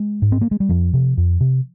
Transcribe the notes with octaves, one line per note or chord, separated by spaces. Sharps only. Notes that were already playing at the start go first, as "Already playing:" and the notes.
Already playing: G#3
G#2
C4
A#3
G#3
G3
F2 F3
C3
F2
C3